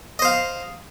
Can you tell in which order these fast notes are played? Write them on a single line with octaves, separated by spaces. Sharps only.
D#5 C5 F5